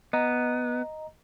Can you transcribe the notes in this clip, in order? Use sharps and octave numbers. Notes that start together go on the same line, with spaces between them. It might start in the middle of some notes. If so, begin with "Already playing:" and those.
B3 D#5 A#5